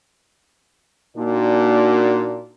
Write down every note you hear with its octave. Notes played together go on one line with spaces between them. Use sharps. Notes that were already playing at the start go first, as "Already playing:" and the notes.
A#2 A#3 D4 D#4 F#4